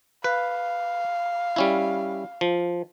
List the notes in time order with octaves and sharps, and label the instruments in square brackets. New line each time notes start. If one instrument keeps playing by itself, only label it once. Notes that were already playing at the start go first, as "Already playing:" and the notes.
[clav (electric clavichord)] B4 [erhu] F5
[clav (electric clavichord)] G3 C#4 E4
F3